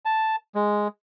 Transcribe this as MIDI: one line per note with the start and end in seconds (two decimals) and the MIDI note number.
0.05 0.36 81
0.55 0.88 56